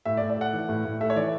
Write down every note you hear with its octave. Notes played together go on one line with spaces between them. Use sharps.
A2 E5
D5
A2
D5
A3 F#5
E3
A2
A2
A3 E5
C#5
E3 D5